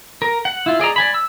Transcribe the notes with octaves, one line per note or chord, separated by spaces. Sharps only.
A#4
F#5
E4 F4
G#4 D5 D#5 A#5
D5 G#5 B5
E6